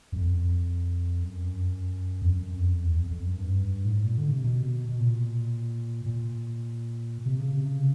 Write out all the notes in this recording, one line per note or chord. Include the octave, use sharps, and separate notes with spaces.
F#2
F2
F#2
F2
F#2
F2
E2
F2
F2
F#2
G2
A2
G#2
A#2
D3
C3
B2
B2
A#2
A#2
C3
C#3
C3
C#3